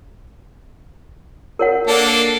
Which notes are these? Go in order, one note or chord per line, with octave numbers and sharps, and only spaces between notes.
A#4 C#5 F#5
A#3 D4 A4